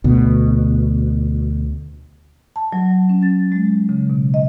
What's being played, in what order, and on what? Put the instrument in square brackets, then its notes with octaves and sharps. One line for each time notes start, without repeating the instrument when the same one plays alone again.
[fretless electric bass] D2 B2
[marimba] A5
F#3
C#4
A6
G#3
C#3
B2
D#5